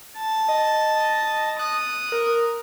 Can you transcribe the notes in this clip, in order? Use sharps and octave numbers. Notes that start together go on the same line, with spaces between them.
A5
D#5
D#6 F#6
A#4